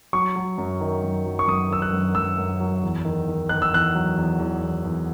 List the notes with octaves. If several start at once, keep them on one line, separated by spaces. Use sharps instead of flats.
F#3 C#6
F#3
F#2
D#3
F#2
F#3
C#6
F#2 D#6
D#3 E6
F#6
F#2
F#2 E6
F#2
F#3
E2
D#3
D#3
D#3 F#6
E6
E2 F#6
F#3
E2
E2
E2
E2